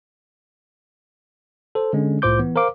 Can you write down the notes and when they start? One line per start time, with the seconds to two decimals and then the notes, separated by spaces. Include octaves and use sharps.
1.75 A4 C5
1.93 D3 G#3 C#4
2.22 C2 A2 F4 C5 D6 G6
2.39 E3 B3
2.56 A#4 C5 F5 D6